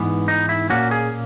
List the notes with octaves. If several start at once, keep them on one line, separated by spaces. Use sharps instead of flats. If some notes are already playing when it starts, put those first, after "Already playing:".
Already playing: G#2 E3 B3
D#4
E4
A#2 A#3 C#4 F#4
G#4